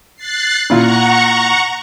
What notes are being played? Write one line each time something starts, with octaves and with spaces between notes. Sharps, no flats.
F#6 A6 C7
A#2 E4 F4 F#5 A#5 C#6